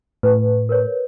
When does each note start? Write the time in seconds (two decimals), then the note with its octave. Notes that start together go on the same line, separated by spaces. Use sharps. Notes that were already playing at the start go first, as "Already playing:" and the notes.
0.23 A2 B4
0.69 A#4 B4 C#5